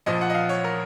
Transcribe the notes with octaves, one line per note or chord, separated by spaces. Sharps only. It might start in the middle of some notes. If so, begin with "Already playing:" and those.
A#1 A#2 F3 D#5
F#5
D#5
F5
C#5
A#4